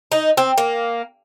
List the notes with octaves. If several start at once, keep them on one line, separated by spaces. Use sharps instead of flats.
D#4
C4
A#3